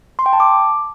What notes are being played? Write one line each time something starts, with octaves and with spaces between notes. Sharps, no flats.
C6
G5
A5
D6